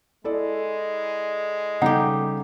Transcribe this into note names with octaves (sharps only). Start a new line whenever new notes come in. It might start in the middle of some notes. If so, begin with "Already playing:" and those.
G#3 E4 A4 D5
C#3 G3 D#4 G4 A4 F#5